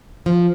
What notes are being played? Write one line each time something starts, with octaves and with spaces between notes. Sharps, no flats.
F3